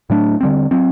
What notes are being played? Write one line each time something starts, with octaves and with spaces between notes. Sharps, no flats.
A2 F#3 A3 D4
D3 G3 C4
F#3 C4